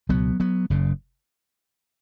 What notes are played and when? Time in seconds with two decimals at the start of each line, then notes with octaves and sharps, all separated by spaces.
0.09 C#2 B2 F#3 B3
0.40 F#3 B3
0.70 F#1 F#2 C#3